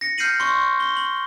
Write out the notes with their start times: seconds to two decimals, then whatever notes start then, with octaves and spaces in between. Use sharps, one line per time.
0.01 A#6 C#7
0.18 F6 G6 C7 C#7 D#7 F#7
0.40 C6 C#6
0.80 G7
0.97 F#7